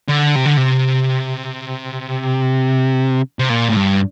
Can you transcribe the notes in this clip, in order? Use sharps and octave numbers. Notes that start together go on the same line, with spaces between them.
D3
C3
D3
C3
C3
A#2
A2
G2